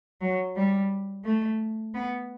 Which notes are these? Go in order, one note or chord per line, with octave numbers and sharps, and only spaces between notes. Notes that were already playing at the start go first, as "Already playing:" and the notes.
F#3
G3
A3
B3